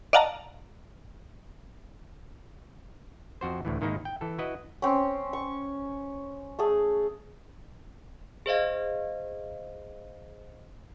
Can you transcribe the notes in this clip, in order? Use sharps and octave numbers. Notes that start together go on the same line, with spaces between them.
D5 D#5 F5 F#5 A5 A#5
F2 F#4 C5
D2 A2 E3
G#2 D#3 A#3 D#4 E4
G5
E3 A4
E4 F#4 B4 D#5
C4 C#4
C#6
A3 G#4
G#4 C5 D#5 F5